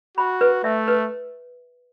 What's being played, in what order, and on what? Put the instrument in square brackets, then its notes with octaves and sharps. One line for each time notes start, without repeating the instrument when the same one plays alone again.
[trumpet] F#4 [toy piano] B5
[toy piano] B4
[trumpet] A3 [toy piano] E5
[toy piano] B4